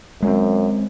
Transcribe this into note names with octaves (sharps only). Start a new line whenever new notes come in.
F#2 G#3 C4